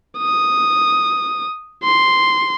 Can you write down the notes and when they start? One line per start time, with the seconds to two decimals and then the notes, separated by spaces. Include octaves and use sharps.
0.18 D#6
1.84 C6